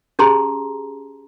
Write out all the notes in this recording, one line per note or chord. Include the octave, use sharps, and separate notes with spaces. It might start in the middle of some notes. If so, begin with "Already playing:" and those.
C#4 G4 G#4 A5 A#5 C6